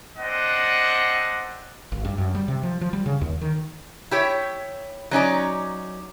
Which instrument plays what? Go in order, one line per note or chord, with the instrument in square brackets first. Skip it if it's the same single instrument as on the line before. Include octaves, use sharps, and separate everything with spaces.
[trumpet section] C4 D4 D#5 F#5
[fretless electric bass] G#1
G2
F#2
G3
C3
F3
F3
G3
C#3
D#2
D#3
[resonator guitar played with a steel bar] E4 G4 C#5
F#3 C#4 D#4 D5